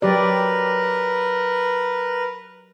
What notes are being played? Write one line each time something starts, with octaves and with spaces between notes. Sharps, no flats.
F#3 G4 A#4 B4 D5